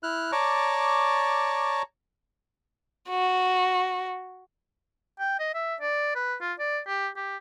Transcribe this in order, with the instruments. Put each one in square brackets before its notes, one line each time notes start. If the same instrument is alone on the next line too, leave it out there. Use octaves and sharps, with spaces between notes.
[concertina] E4 F6 F#6
C#5 D5 A5 A#5 C#6 D6
[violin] F#4
[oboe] G5
D#5
E5
D5
B4
F4
D5
G4
G4